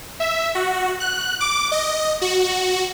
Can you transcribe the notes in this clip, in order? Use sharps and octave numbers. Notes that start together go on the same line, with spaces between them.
E5
F#4
F#6
D6
D#5
F#4